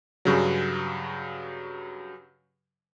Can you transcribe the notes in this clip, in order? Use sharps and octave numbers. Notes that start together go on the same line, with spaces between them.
G2 C#3 F#3